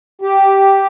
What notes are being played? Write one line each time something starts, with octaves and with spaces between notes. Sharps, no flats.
G4